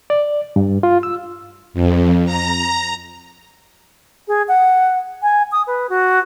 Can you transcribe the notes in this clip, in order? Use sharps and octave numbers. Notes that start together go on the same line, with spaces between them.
D5
G2
F4
E6
F2
A#5
G#4
F#5
G#5
D#6
B4
F#4